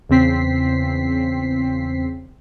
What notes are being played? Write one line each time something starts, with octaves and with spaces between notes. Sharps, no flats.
E2 C#3 C4 B6 C7